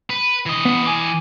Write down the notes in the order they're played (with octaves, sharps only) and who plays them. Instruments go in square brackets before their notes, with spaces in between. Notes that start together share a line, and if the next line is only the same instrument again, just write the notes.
[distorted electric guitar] B4
E3 D#5
[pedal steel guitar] B3
G#5 D6